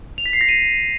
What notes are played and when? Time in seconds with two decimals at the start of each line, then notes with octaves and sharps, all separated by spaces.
0.18 F7
0.26 B6
0.33 C7
0.41 A#6
0.48 D#7